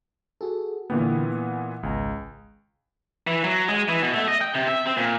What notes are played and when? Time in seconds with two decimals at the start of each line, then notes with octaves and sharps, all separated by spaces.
0.41 F#4 G#4 A4
0.90 A#2 D3 E3 A#3 B3 G5
1.32 F#5
1.83 G#1 C#2 G#5 A#5
3.27 E3
3.44 F#3
3.68 G#3
3.89 E3
4.02 B2
4.14 A3
4.28 D#5
4.41 G5
4.55 C3
4.68 E5
4.85 C4
4.97 A#2